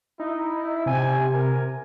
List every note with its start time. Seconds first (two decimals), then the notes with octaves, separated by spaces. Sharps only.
0.20 D#4 E4
0.86 C3 G#5
1.33 A#4